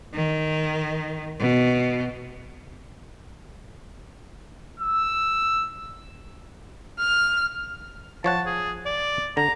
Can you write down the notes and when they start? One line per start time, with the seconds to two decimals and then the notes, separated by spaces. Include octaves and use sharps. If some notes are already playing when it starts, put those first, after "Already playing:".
0.13 D#3
1.39 B2
4.80 E6
7.00 F6
8.24 F3 C#5 F#5 A5
8.46 G#4
8.85 D5
9.37 D3 A#5